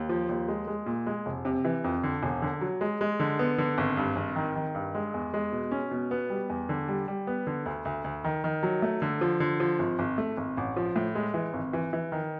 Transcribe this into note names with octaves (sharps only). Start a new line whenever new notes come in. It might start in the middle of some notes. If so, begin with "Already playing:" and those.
Already playing: D#2
F3
D#2
G#3
G#3
A#2
G#3
F1
C3
E3
F2
D3
E1
D3
F#3
G#3
G#3
D3
B3
D3
G#1
G2
G#1
D#3
D#3
G2
G#3
E2
G#3
B2
C#4
B2
B3
G3
E2
D3
G3
G3
B3
D3
D2
D2
D2
D#3
D#3
F#3
A3
D3
F3
D3
F3
G#1
G#1
A3
G#1
A1
F3
A2
G#3
E3
G#1
E3
E3
D#3